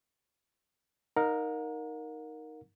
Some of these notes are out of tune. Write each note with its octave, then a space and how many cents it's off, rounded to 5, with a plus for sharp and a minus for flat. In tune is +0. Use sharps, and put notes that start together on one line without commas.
D#4 +0 A#4 +0 F#5 -45